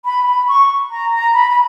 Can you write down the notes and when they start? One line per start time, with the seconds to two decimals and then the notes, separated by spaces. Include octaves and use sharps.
0.05 B5
0.27 B5
0.48 C#6
0.91 A#5
1.12 A#5
1.34 B5
1.51 B5